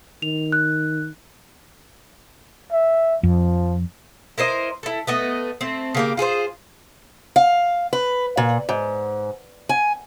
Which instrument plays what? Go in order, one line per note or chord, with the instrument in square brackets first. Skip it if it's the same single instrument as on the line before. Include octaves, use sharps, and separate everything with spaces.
[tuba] D#3 [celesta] F7
[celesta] F#6
[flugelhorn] E5
[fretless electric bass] F2 [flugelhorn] F3
[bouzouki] E4 A#4 C5 D#5
E4 A4
A3 B3 D#5
A3 C4
C#3 A#3 G4
F4 G#4 A4 C5
[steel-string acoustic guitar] F5
B4
A#2
G#2
G#5